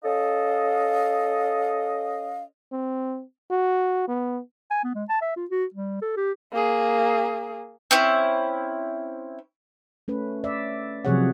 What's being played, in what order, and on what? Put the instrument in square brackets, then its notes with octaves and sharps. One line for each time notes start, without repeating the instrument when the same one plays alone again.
[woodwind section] C#4 A4 D#5 F5
[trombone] C4
F#4
B3
[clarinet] G#5
B3
G#3
A5
E5
F4
F#4
G3
A4
G4
[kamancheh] A#3 G#4
[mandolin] C4 C#4 E4
[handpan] A3 C#4 B4
D5 E5
C3 F3 F#3 G#4 C#5 F#5